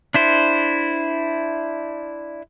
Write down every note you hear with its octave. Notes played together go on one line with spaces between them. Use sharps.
D4 E4 C5